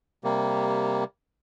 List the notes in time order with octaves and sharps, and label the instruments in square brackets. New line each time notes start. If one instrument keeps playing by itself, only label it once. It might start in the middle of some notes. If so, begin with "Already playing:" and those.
[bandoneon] C3 G3 A#3